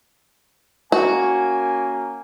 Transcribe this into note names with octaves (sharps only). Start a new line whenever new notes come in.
A#3 C#4 F#4 G#5